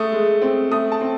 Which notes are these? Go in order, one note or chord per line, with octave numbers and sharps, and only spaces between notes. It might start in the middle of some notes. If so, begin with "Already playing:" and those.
Already playing: A3 D#6
G#3
C4
A3 D#6
A5
C4